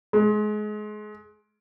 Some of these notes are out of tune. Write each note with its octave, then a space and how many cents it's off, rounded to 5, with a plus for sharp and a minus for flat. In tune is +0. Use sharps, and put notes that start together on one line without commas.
G#3 +25